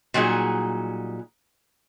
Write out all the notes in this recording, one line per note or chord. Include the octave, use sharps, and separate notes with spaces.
A#2 F#3 G3 D#4 G#4